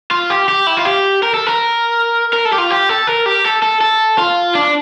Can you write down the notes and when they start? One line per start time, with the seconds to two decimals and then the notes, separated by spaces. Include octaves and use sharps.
0.11 F4
0.30 G4
0.48 G4
0.67 E4
0.77 F4
0.85 G4
1.23 A#4
1.34 A4
1.47 A#4
2.33 A#4
2.45 A4
2.53 G4
2.58 F4
2.70 G4
2.89 A4
3.07 A#4
3.26 G4
3.45 A4
3.62 A4
3.81 A4
4.18 F4
4.55 D4